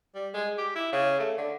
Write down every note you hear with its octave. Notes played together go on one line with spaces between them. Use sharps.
G3
G#3
G4
E4
C#3
A3
D3